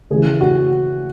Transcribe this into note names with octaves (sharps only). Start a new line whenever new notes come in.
C#3 E3 G#4
F#4